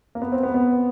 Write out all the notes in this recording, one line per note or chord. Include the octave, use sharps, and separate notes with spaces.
A#3
B3
C4
B3
B3